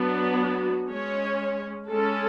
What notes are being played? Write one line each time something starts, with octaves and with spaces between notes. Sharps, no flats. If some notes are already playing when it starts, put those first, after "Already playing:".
Already playing: F#3 B3 D4
F#4
G#3 C#4 C#5
G#3 C#4 A4